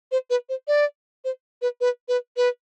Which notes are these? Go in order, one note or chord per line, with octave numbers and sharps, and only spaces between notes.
C5
B4
C5
D5
C5
B4
B4
B4
B4